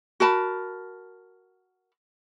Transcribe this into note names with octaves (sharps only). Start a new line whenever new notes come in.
F#4 A#4 A5 B5